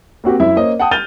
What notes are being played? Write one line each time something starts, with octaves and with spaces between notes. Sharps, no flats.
A#3 C4 F#4 G4
F#2 E4 E5
A#3 C#4 C5 D#5
F#5 G5 A5 D#6
F6 G6 A6 D#7 F7 G7